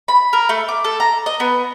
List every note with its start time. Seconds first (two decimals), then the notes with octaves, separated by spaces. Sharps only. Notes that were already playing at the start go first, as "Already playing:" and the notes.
0.08 B5
0.33 A#4
0.49 A3
0.68 D6
0.84 A4
1.00 A#5
1.26 D#5
1.40 B3